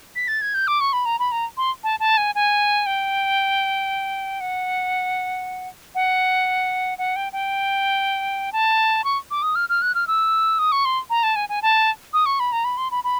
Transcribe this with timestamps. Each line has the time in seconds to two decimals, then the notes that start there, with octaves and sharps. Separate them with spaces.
0.16 B6
0.28 A6
0.41 G#6
0.54 G6
0.67 D6
0.80 C#6
0.93 B5
1.05 A#5
1.19 B5
1.32 A#5
1.57 C6
1.83 A5
2.00 A5
2.17 G#5
2.35 G#5
2.86 G5
4.40 F#5
5.95 F#5
6.98 F#5
7.16 G5
7.33 G5
8.52 A5
9.04 C#6
9.31 D6
9.42 D#6
9.55 F6
9.69 F6
9.82 F#6
9.95 F6
10.07 E6
10.59 D#6
10.72 C#6
10.85 C6
11.10 A#5
11.23 A5
11.36 G#5
11.49 G#5
11.62 A5
12.13 D#6
12.26 C#6
12.40 B5
12.52 A#5
12.64 B5
12.77 C6
12.91 B5
13.04 B5